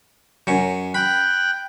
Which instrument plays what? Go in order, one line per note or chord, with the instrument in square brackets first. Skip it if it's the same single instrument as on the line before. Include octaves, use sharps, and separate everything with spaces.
[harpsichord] F#2 C#4
[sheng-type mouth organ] G5 F#6 [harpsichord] B5